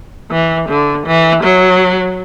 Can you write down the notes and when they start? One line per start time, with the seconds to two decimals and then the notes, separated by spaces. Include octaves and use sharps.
0.31 E3
0.69 D3
1.06 E3
1.44 F#3